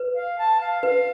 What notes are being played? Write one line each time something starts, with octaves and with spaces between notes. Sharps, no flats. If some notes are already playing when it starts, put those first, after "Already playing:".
Already playing: B4
F5
A5
F5
B4 F5